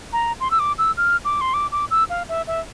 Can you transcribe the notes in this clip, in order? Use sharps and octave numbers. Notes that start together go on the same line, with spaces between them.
A#5
C6
E6
D6
E6
F6
D6
C6
D6
D6
E6
F5
E5
E5